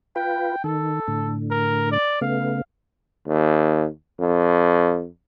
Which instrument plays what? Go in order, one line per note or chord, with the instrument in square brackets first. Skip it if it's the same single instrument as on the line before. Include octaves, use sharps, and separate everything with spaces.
[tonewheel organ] F4 B4 [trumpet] G5
[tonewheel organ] D#3 [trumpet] A4
[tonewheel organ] A2 D3
[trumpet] A#4
D5
[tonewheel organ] C#3 A3 B3 [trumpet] F5
[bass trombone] D#2
F2